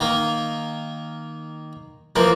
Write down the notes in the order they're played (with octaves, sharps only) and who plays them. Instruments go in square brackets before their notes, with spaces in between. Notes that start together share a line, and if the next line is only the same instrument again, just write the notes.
[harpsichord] D#3 A#3
[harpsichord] E3 F3 [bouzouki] A#3